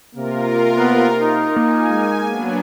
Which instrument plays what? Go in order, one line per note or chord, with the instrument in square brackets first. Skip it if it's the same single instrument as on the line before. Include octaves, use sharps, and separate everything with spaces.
[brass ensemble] C3 A#3 [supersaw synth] F4 A#4
[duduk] B3
D#4
[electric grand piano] A#3 [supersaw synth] G#5
[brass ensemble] G#3
[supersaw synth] F#3 B3 D4